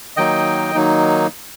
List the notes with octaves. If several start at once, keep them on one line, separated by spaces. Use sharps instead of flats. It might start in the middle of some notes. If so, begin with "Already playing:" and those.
D#3 F#3 A#3 D#4 D#5 G5
D#3 F#3 A#3 D#4